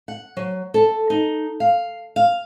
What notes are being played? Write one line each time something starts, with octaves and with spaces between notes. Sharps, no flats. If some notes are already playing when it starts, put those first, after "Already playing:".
F#5
F#3
A4
D#4
F5
F5